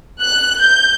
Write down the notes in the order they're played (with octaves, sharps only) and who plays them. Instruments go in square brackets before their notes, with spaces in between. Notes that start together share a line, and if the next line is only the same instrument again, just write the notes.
[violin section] F#6
G6